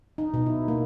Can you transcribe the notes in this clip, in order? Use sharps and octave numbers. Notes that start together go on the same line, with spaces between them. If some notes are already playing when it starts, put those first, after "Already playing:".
D#4
B2
E4
A#3